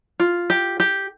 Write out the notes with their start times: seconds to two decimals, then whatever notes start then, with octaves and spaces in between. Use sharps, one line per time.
0.20 F4
0.50 G4
0.80 G4